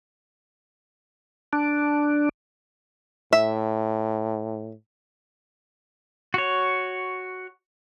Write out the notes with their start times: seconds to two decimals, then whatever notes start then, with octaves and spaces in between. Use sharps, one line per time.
1.53 D4
3.33 A2 E5
6.34 F#4 C#5